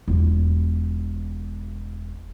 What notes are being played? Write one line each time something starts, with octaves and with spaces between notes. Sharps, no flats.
E1 F4